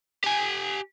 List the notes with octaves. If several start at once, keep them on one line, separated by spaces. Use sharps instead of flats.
G4 G#5